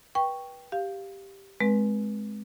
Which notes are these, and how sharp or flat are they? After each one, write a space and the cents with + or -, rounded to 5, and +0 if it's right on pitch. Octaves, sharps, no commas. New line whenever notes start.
B4 -25 G5 +0 C#6 +0
G4 +0 F5 +0
G#3 +25 C4 +5 B4 -25